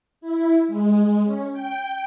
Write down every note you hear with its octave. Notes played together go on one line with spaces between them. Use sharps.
E4
G#3
C#4
G5